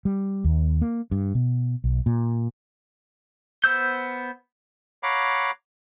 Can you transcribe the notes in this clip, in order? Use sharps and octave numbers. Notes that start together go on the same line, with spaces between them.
G3
D#2
A#3
G2
B2
B1
A#2
B3 C5 E6 G6
C#5 F5 F#5 A#5 B5 D6